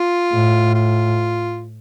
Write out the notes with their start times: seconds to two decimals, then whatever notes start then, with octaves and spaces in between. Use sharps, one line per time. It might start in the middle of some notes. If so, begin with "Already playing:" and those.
Already playing: F4
0.32 A2
0.75 F4